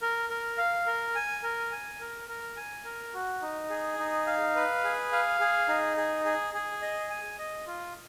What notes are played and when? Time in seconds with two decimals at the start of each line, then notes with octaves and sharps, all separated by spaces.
0.02 A#4
0.29 A#4
0.58 F5
0.86 A#4
1.15 G#5
1.43 A#4
1.72 G#5
2.00 A#4
2.29 A#4
2.57 G#5
2.85 A#4
3.14 F#4
3.42 D#4
3.70 G#4
3.98 D#4
4.27 F5
4.55 B4
4.84 G#4
5.12 F5
5.40 G#4
5.68 D#4
5.97 G#4
6.25 G#4
6.54 G#4
6.82 D#5
7.10 G#5
7.39 D#5
7.67 F4